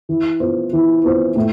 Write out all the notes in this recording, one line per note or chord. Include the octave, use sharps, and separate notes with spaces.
E3
B3 F4 C5
E3
B3 F4 C5
A2